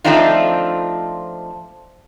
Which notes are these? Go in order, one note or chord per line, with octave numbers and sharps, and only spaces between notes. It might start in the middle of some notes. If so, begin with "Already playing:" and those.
F3 A3 C4 D4 D#4 F4